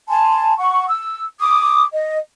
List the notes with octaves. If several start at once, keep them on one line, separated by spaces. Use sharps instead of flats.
G#5 A5 C6
F#5 C#6
E6
D6 D#6
D#5